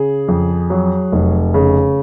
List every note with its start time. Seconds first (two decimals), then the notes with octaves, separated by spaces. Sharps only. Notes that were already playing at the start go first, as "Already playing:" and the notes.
Already playing: C#3 G#4
0.28 F2
0.70 F#3
1.12 F1
1.54 C#3